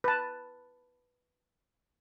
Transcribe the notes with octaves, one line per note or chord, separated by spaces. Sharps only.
B4 A5